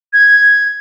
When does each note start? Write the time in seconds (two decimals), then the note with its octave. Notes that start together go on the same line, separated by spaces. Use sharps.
0.13 G#6